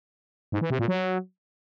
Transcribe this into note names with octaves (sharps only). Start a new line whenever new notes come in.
G#2
E3
C3
A#2
F#3